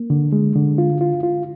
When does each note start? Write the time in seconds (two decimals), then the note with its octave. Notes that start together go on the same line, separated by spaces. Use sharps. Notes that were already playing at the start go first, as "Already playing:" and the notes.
Already playing: A#3
0.10 D3
0.33 G#3
0.56 D3
0.78 F4
1.01 F4
1.23 F4